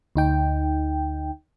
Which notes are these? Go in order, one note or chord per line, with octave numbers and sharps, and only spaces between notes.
D2 D#4 G5